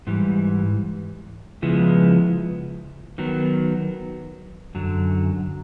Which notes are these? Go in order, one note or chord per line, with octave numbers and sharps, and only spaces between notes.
G#2 E3 G3
C#3 F3 G#3 B3 E4
D#3 F#3 B3
F#2 D3 F#3